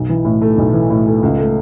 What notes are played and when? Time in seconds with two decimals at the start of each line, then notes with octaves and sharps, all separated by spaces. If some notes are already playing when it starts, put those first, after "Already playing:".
Already playing: B1
0.09 E3
0.25 A2
0.42 A3
0.58 B1
0.74 E3
0.90 A2
1.07 A3
1.23 C#2
1.38 A3